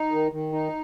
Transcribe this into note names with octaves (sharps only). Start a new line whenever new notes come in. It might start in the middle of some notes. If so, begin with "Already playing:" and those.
Already playing: D#4
D#3
D#3
D#4